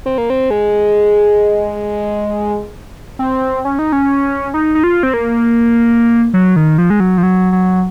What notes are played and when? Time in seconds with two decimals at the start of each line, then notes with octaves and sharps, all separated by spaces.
0.06 C4
0.18 A#3
0.30 C4
0.51 G#3
3.19 C4
3.65 C#4
3.79 D#4
3.92 C#4
4.54 D#4
4.75 D#4
4.84 F4
5.03 C4
5.14 A#3
6.34 F#3
6.56 D#3
6.78 F3
6.90 G#3
7.00 F#3
7.18 F3
7.23 F#3
7.52 F#3